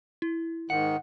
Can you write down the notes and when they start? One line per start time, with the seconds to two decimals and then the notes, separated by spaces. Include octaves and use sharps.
0.22 E4
0.70 G#2 D#3 F#5